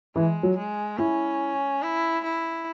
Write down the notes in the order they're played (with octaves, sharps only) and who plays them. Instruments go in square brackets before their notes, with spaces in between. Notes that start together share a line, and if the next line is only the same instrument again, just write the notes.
[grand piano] E3 [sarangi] G#3
[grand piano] F#3
[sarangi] G#3
[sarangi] C#4 [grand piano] E4
[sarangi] E4
E4